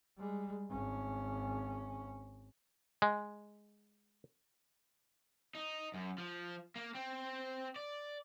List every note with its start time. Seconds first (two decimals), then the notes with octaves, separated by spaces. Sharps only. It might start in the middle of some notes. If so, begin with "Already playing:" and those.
0.18 G3 G#3
0.70 G#1 C#4
3.02 G#3
5.55 D#4
5.94 F#2
6.18 F3
6.76 A#3
6.95 C4
7.76 D5